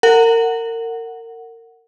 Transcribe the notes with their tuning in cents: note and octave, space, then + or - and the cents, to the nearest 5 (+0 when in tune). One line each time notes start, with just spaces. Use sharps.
A#4 -30 F#5 +0